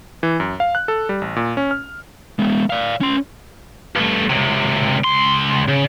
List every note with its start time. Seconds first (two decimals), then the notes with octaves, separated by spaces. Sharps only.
0.23 E3
0.40 F#2
0.60 F5
0.75 F#6
0.88 A4
1.09 G3
1.22 A1
1.36 A#2
1.57 C#4
1.71 F6
2.39 G#3 B3
2.70 D5 F5
3.01 C#4 C6
3.96 G2 A3
4.30 C#2 C3
5.04 C#2 C6
5.68 C#3